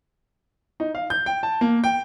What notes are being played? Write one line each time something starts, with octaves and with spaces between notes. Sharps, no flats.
D#4
F5
G6
G5
A5
A#3
G5